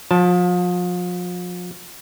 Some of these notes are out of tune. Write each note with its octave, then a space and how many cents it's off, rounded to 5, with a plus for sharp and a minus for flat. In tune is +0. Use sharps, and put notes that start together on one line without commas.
F3 +35 A5 +0